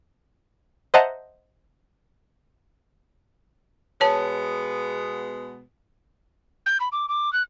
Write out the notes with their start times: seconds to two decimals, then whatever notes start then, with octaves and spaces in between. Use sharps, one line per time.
0.94 C5 D#5 E5 F#5 A5 A#5
4.01 B2 G#3 B3 C#5 A5
6.66 G6
6.80 B5
6.92 D6
7.09 D6
7.33 F#6